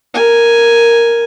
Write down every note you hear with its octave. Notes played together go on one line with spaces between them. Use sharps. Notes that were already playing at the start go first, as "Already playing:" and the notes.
A#4 G#5